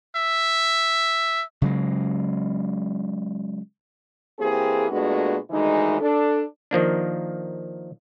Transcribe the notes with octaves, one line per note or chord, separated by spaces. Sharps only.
E5
C#3 F#3 G#3
E3 A#3 C4 G4 G#4
A#2 G#3 A3 B3 D4 F#4
D2 D#3 E3 G#3 D#4
D4 A4
D#3 F3 A#3 D4